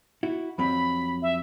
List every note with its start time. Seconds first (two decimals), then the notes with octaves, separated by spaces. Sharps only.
0.23 E4 F#4
0.58 F2 F#3 C4 B5
1.22 E5